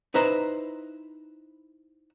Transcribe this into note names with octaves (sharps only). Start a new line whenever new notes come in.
D#4 E4 B4 C5 A#5